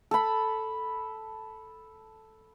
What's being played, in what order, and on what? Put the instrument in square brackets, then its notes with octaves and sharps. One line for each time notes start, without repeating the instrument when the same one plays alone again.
[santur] A4 B5